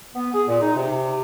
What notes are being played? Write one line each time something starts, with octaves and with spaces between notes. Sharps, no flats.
B3
G#4
A#2
D#4
C3